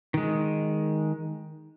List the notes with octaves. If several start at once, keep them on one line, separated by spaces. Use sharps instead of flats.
D#3 G#3